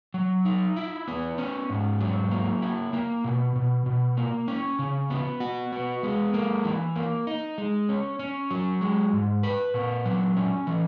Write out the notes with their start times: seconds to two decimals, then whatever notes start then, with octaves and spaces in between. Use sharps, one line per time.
0.14 F#3
0.45 D#4
0.76 E4
1.08 B3
1.38 C#4
1.70 G#2
2.01 F#3
2.31 A#3
2.62 E4
2.93 A#3
3.24 B2
3.56 B2
3.86 B2
4.17 A#3
4.48 C#4
4.79 C#3
5.10 B3
5.40 F#4
5.72 B3
6.03 G#3
6.34 A#3
6.65 E3
6.96 A#3
7.27 D#4
7.58 G#3
7.89 C#4
8.19 C#4
8.50 F#3
8.81 G#3
9.13 G#2
9.43 B4
9.74 A#2
10.06 F#3
10.37 C#4
10.67 E3